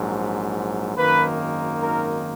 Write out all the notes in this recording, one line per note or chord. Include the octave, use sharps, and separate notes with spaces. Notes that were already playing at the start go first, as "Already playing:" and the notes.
Already playing: A#1 G#2 F#3
G#1 F#2 D#3 A#3 B4
A#4